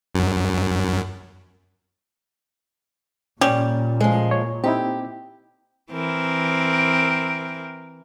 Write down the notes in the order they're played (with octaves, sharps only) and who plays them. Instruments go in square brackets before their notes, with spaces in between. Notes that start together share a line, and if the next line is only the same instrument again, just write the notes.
[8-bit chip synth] F#2
[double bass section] A#2 [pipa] G3 [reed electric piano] C#4
[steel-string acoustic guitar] F3 G#3
[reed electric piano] C#5
[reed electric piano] C4 D#4 E4 [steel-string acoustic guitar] G4
[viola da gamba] E3 C4 A#4